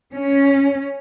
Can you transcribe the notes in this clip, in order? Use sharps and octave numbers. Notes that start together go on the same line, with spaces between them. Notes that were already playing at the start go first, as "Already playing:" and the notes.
C#4